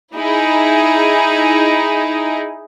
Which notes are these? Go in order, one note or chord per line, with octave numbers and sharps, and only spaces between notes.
D#4 E4 G#4